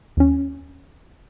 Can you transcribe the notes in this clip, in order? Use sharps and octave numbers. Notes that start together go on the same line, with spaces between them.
D#2 C#4